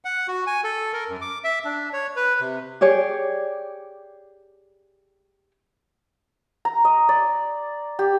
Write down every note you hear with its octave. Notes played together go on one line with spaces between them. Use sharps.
F#5
F#4
G#5
A4
A#4
F#2
D6
E5
D4
C#5
B4
C3
G4 G#4 C#5 D5
A#5
D#5
D5
G4